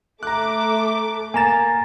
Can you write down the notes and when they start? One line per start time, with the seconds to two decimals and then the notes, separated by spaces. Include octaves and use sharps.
0.23 A3 A#5 D6 F#6
1.34 A#3 G#5 A#5 A6 E7